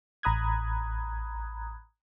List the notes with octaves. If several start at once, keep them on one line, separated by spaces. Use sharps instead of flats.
A1 A#5 B5 D#6 F#6 G#6